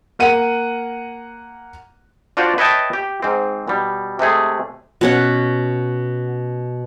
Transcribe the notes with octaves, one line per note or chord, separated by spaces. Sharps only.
A#3 F#5 D#7
D4 F4 F#4 C5 D5
B4 C#5 D#5 E5 G5 A5
G4
G#2 C4
B2 G3
C3 G#3 A3 G#4
B2 C#4 F#5